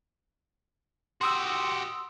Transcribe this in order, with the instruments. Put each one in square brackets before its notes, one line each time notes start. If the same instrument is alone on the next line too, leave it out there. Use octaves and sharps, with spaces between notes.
[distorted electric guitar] F#4 G4 [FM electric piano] C6 D#6 E6